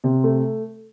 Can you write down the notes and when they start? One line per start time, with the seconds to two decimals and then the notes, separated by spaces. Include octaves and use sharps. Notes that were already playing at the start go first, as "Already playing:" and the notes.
0.04 C3
0.24 A3